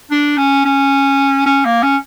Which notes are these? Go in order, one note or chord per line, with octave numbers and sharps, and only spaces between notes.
D4
C#4
C#4
C#4
A#3
C#4